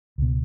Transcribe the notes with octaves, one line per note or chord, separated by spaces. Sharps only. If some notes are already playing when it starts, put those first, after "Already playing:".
C#2 B2